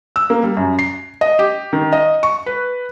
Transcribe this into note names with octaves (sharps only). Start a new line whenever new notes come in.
E6
A#3
G3
F#2
C7
D#5
G4
D#3
D#5
C#6
B4